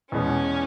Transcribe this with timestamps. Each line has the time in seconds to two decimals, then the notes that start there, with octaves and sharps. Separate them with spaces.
0.12 E2 B2 G#3 B3 C#4